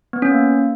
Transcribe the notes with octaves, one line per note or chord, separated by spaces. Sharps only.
B3
C#4
A#3